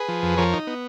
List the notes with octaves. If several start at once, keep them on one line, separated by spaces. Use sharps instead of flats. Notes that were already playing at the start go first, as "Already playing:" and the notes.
Already playing: G#4 B4
F3
F2
F3 A#4 C#5
D#4
B3